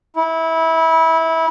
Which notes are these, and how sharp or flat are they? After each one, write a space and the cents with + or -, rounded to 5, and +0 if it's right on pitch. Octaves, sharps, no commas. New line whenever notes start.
E4 -20